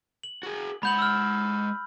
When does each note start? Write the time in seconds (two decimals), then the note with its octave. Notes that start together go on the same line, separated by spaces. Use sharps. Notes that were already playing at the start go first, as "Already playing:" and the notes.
0.23 F#7
0.43 F#4 G#4
0.83 G#3 F#5 B5 G6 F#7
0.99 E6 F6